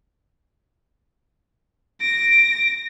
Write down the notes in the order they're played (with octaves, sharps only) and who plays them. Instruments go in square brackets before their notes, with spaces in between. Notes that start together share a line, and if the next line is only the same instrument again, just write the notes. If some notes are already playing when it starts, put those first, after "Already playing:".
[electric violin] A#6 [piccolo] D7